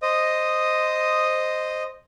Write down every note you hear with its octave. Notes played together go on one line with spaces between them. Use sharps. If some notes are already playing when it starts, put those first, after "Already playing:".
C5 D#5 D#6